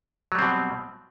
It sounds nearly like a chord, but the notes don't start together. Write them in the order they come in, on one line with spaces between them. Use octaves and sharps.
F#3 G3 C4 B2